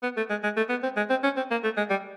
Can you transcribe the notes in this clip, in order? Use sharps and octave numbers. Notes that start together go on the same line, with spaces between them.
B3
A3
G#3
G#3
A3
B3
C4
G#3
C4
C#4
C4
A#3
A3
G#3
G3